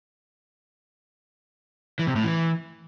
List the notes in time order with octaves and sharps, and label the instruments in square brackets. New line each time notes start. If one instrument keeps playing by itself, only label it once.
[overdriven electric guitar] E3
C3
A2
E3